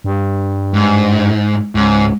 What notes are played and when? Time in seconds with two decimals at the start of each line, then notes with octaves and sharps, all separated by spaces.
0.04 G2
0.74 G#2
1.75 C#2 G#2